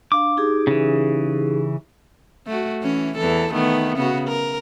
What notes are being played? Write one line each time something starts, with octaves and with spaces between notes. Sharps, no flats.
D4 F5 D6
D#4 G4 G#4
C#3 E3
A3 F#4
E3 C#4
E2 E3 A4
D#3 A3 B3
C#3 B3 F#4
A#4